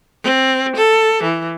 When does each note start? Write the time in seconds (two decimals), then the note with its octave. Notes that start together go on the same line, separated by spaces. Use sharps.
0.23 C4
0.76 A4
1.23 E3